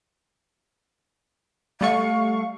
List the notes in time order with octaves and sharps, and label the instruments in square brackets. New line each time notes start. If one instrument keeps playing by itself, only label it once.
[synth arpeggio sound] G3 A3 C#6 [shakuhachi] F5